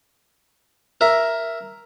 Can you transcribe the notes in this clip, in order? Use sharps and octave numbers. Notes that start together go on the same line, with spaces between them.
A#4 E5